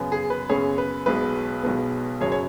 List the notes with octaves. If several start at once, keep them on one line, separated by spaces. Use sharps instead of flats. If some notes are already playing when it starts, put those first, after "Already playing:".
Already playing: F#2 C#3 B3
G#4
B4
F#2 C#3 B3 G#4 C#5
B4
B1 B2 G#3 B3 B4
B1 B2 G#3 B3
F#1 F#2 F#3 G#4 C#5
C#5